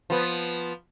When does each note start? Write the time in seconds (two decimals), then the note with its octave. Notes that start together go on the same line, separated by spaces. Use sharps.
0.10 F3 B3